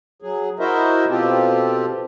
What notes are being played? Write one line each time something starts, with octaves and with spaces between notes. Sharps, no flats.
F#3 G#4
E4 F#4 A#4 C5 D#5 E5
B2 C4 F4 G4 A4